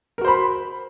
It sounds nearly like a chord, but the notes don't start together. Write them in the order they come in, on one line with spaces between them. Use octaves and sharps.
A#4 F#4 C5 B5